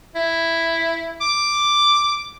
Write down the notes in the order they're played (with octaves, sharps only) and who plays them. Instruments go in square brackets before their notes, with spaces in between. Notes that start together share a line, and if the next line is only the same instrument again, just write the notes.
[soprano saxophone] E4
D6